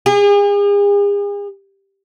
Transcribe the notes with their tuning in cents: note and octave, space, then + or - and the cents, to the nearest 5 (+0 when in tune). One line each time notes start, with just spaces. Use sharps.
G#4 -40